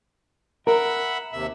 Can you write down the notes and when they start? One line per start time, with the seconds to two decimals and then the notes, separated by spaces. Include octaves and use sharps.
0.67 A#4 E5 F#5 B5
1.33 D#2 C3 E5